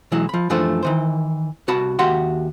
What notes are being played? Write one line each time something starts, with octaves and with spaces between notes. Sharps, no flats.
B1 E3 F#3 G#3 E4
F3 B5
F#2 E3 F3 A3 D4 C5
D#3 E3 C5
C2 F#4 A5 B5
D#2 F#4 G4 E5 F#5 C6